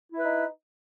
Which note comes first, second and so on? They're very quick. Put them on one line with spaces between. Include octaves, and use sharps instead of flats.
E4 E5 B4 D#4